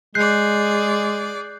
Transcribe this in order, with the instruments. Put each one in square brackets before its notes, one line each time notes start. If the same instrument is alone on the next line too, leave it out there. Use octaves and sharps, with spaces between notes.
[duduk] G#3 [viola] G#4 D5 [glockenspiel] F#6 G6 C7